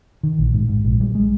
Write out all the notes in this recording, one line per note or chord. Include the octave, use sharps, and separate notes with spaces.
D#3
A#1
G#2
G#2
A#1
G3
G#3